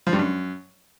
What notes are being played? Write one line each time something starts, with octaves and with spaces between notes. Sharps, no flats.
F3
G2
F#2